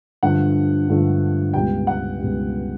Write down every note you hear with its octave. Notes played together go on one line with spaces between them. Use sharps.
G2 D3 F3 A3 F#5
G2 D3 F3 A3
C#2 B2 G3 G5
F#5
C#2 B2 G3